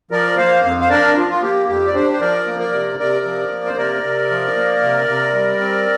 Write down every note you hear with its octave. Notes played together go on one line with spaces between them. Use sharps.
F3 A#4 D5
A#3 C5 F5
F2 F5
C5 F5
D4 A#4 D5
F3 F4
F4
A#3 G4
F2 G4
D5
D4 G4 C5
C5
F3 A#4 D5
A#3
A#4 D5
C3
C3 A#4 D5
F3
A#3
C5
C3 A#4 D5
C3
F3
A#3
C3
C3
G3
C4